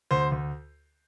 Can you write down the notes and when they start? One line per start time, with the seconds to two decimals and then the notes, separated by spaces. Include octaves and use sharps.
0.11 D2 C5
0.32 D2